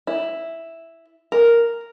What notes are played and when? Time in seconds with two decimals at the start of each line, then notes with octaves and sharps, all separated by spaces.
0.07 E4
1.32 A#4